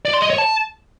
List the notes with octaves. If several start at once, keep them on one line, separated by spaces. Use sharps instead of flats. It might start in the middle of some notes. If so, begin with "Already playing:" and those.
D5
C6
D#5
C#5
A5